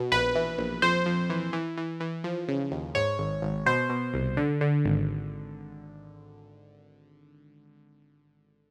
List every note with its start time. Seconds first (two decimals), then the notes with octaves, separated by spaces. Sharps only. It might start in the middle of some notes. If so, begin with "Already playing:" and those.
Already playing: B2
0.12 A#1 B4
0.35 E3
0.58 A#1
0.82 F2 C5
1.06 F2
1.30 E3
1.53 E3
1.77 E3
2.00 E3
2.24 F3
2.48 C#3
2.72 D#2
2.95 G#2 C#5
3.19 G#1
3.42 G#1
3.66 B2 C5
3.89 B2
4.14 C2
4.37 D3
4.61 D3
4.85 G#1